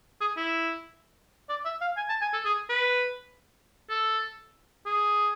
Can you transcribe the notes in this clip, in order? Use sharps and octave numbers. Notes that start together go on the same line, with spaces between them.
G#4
E4
D5
E5
F5
G#5
A5
G#5
A4
G#4
B4
A4
G#4